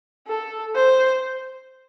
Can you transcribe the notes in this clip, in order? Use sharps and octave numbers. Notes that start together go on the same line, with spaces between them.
A4
C5